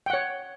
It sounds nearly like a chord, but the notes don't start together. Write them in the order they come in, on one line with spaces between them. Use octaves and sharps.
G5 F#5 C#5